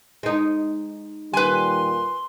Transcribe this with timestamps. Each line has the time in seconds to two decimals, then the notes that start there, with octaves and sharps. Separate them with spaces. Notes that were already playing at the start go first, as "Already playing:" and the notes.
0.23 G#3 D#4
1.33 A#2 D#3 G3 B4 G#5 C6